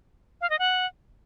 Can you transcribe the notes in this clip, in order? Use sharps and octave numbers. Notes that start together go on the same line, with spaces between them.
F5
D#5
F#5